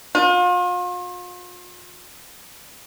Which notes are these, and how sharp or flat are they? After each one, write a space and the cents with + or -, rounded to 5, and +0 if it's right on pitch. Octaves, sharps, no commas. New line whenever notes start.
F4 +40